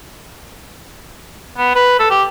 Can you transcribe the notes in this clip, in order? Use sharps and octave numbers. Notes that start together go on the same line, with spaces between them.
B3
B4
A4
G4